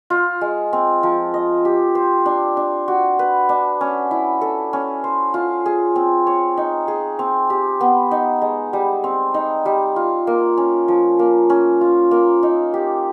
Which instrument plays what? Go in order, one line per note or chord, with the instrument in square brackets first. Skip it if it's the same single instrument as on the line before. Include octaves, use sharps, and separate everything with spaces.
[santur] F4
G#3
C4
F3
D#5
G4
C5
D4
D4
F#4
B4
D4
C#4
E4
A4
C#4
C5
F4
G#4
C4
C#5
D#4
G#4
C4
G4
B3
D#4
G#3
G3
C4
D#4
G3
F4
A#3
C#4
F3
A#3
C#4
F4
A#3
D#4
G4